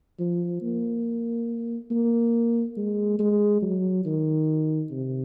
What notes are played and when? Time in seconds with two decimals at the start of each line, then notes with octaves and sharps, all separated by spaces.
0.20 F3
0.62 A#3
1.91 A#3
2.77 G#3
3.20 G#3
3.62 F#3
4.05 D#3
4.91 C3